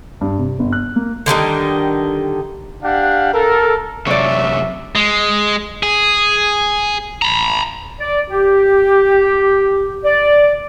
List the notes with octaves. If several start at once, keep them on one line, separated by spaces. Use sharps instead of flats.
G2
C3
G1
F#6
A#3
D3 D#3 G3 D#4
D4 G4 F5 F#5
A4 A#4
F#2 C3 C#5 D5 E5
G#3
G#4
A#5 B5
D5
G4
D5